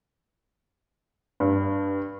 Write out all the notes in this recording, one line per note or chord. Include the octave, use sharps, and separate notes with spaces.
G2